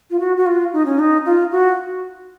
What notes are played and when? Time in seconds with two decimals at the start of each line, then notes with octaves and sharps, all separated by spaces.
0.11 F4
0.20 F#4
0.37 F#4
0.46 F4
0.73 D#4
0.85 C#4
0.99 D#4
1.25 F4
1.52 F#4